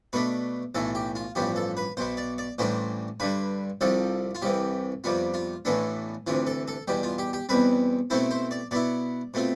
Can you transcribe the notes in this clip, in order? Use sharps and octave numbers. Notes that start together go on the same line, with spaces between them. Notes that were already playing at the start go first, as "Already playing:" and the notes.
B2 A3 D4 B4
B1 A2 E3 A4
G4
F4
A1 G2 F3 B3 G4
A4
B4
B1 B2 B3 C5
D5
D5
A1 A2 E3 G3 D4 C5
G2 D3 G3 B4
C2 C3 F3 A4
F4
C2 C3 E3 G4
F2 C3 G3 B3 F4
F4
A1 A2 E3 B3 D4 A4
D2 C3 E3 F4
A4
A4
E2 B2 G3 G4
F4
G4
G4
E2 B2 G3 C4 B4
B2 A3 C4 E4 C5
C5
D5
B2 B3 E4 D5
B2 A3 C4 F4